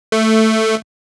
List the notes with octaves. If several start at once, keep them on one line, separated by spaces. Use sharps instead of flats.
A3